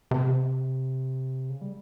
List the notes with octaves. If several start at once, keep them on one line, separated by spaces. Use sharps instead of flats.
C3
C#3
G3